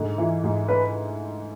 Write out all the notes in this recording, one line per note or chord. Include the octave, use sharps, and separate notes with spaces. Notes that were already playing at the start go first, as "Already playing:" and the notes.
Already playing: G#2 D3
E3
G#2
B4